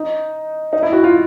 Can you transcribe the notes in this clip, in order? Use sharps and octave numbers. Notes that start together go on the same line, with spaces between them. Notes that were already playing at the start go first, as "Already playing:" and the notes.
Already playing: D#4
D#4
E4
F#4
F4